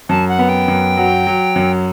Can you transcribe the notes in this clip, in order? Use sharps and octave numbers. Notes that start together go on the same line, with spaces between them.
F#2 A5
F#5
B3
G5
F#2
F#3
F#3
F#2